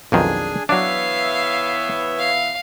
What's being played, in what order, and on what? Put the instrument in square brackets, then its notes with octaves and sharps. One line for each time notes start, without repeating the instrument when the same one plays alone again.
[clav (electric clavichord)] B1 F2 D#3 [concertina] D4 G#4 G#5
[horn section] E3 B3 E5 [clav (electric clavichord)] F#3 D4 [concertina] C#5 [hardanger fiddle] F5
[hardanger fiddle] F5